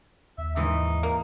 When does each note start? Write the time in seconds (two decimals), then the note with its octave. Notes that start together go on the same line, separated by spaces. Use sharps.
0.38 D#2 E5
0.56 G#2 E3 G#3 D#4
1.03 A#3